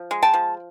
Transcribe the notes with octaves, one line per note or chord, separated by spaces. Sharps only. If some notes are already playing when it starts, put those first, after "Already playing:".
Already playing: F3
G#3
G5 A5
F3